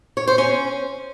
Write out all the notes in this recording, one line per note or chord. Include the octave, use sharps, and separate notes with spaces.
C#5
C5
C#4